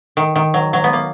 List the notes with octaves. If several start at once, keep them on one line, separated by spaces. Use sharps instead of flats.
D#3
D#3
F#3
F#3
B3
A#3